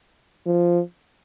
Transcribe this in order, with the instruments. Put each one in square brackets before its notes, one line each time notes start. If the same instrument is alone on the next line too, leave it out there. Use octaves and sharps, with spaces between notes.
[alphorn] F3